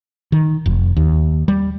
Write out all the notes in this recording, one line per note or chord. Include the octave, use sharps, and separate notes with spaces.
D#3
F1
D#2
G3